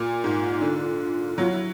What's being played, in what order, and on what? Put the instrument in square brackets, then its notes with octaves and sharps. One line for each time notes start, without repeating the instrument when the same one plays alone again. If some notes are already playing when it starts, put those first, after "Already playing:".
Already playing: [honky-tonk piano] A#2 [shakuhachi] F4
[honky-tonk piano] G#2
D3
[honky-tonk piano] F#3 [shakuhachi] F4
[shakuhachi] E4